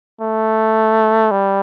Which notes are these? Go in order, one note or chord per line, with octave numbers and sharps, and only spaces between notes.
A3
G3